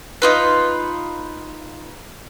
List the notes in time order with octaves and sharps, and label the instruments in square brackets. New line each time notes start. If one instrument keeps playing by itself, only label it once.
[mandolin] D#4 F4 B4